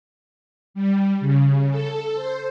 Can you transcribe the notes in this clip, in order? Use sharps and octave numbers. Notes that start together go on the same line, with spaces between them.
G3
C#3
A4
C5